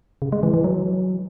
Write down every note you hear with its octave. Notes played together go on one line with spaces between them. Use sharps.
C#3
G#3
E3
E3
F#3